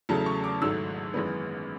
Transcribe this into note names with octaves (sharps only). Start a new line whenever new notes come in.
E2 C#3 F#3 A3 A5
C#6
D6
G#1 G#2 F#3 A3 E6
G#1 F#2 E3 G#3 B3